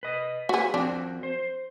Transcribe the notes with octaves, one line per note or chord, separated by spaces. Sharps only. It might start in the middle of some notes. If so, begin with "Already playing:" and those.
B4 D#5
F#4 G#4 B4
F3 C4 D4 F#4
C5